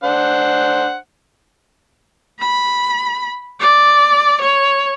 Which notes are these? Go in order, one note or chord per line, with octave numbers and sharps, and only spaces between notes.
D4 C5 F#5
B5
D5
C#5